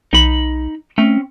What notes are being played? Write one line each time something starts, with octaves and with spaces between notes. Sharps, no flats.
B1 D#4 B5
A3 C4 C#4